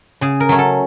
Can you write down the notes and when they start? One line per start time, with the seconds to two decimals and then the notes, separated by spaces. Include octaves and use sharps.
0.21 C#3 G#4
0.40 A#4
0.49 F#3 A3 C#4
0.58 A4